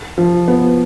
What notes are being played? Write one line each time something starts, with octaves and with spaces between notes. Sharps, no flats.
F3
B3